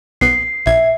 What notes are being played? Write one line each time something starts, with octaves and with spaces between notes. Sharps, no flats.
B1 B3 C7
A#1 E5 G#6